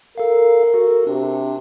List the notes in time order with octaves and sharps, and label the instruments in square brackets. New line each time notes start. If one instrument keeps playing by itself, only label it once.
[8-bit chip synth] A4 F5 [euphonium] A#4
[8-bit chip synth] F#4 A4
[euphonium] C3 [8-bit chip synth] D4